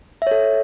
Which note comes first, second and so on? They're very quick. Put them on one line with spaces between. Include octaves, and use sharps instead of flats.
E5 C#5 A4